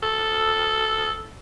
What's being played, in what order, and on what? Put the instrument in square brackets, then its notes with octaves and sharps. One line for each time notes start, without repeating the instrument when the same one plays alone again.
[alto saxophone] A4